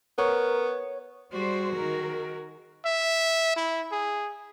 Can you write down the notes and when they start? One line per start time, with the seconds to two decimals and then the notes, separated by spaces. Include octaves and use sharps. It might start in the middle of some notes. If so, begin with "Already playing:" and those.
0.18 B3 A#4 C#5
1.32 G3 F#4 G#4 C5
1.73 D#3 A#4
2.85 E5
3.56 E4
3.92 G#4